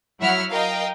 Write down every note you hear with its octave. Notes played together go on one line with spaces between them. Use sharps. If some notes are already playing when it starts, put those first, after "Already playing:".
F#3 E4 E5 F#5 F6
A#4 D#5 F5 G5